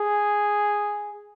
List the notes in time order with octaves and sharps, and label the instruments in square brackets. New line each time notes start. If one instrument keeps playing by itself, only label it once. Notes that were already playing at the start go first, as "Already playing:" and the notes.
Already playing: [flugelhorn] G#4